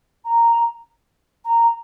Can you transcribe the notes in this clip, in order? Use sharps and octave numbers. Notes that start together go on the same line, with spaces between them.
A#5
A#5